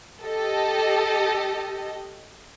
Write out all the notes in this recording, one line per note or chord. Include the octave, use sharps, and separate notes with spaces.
G4 A4 D#5